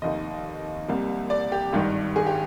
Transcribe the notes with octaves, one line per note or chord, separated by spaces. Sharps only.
F1 D#2 D#3 D#5
C2 C3 G3 A#3
D5
G4
G#1 G2 D#3 G3
G#4
G4